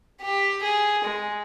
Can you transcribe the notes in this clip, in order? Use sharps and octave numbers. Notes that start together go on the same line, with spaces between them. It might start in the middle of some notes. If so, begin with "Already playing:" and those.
G4
G#4
G#3